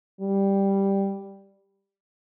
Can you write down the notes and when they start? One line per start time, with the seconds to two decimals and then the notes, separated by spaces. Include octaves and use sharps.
0.20 G3